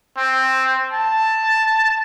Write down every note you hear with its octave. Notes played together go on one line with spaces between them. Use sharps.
C4
A5